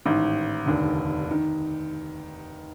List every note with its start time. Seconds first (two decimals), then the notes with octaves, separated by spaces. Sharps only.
0.05 A1 G#2 D#3
0.66 F1 D#2 D3
1.31 D#3